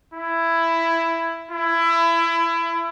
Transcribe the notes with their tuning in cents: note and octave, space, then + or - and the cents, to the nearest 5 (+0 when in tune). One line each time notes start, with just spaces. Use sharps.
E4 +10
E4 +25